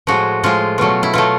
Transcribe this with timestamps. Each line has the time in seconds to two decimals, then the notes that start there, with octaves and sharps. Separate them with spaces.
0.07 A2 F3 G#3 F#4
0.43 A2 F3 G#3 F4
0.78 B2 F#3 A3 F4
1.03 E4
1.14 B2 F#3 A3 F4